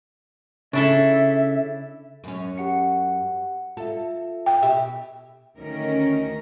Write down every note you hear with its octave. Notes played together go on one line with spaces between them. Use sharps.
C#3 D4 E4 A4 E5
F#2 C#4
G4 F#5 C#7
F4 A4 E5
G5
B2 G4 E5
D2 D#3 C#4 A#4